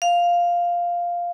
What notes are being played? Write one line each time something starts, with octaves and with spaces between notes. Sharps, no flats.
F5